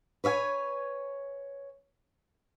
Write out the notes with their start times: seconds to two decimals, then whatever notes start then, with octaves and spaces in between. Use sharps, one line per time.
0.24 B4 C#5 E5 G#5